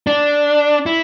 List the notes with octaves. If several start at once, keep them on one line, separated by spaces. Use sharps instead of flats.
D4
E4